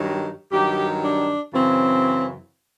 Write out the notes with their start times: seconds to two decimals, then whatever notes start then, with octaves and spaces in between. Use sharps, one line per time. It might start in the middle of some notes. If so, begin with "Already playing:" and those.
Already playing: G2 D#3 F#3
0.51 G2 D#3 F#3 G4
1.03 D4
1.53 F#2 C#3 E3 C4